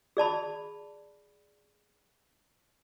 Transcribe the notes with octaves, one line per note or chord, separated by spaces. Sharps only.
G#4 D5 A5 B5